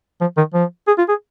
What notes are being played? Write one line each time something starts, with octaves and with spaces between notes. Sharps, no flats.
F3
D#3
F3
G#4
F4
G#4